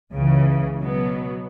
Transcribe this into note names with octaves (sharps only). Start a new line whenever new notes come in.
C#2 C#3 E3
B2 F#3 B3